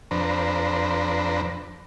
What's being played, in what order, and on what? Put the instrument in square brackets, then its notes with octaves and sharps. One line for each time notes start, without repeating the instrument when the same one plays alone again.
[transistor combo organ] F2 D4 B4 C5 A#5